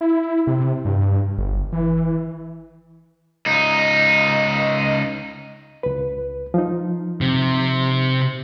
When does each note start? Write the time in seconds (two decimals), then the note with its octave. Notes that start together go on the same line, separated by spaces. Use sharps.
0.01 E4
0.47 C3
0.85 G2
1.38 G1
1.72 E3
3.46 C#2 D#4
5.83 C#2 B4
6.54 F3 D#4
7.21 C3